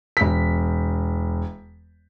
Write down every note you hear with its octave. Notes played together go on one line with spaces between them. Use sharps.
E1 B6